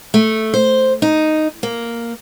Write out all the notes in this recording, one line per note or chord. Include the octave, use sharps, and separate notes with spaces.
A3
C5
D#4
A#3